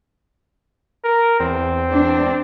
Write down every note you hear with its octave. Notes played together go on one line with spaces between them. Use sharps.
A#4
E2 C4
D4